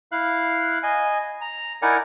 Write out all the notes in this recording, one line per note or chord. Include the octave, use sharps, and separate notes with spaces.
E4 F5 F#6
D#5 G#5
A#5
D#4 E4 A#4 D5 F#5 G#5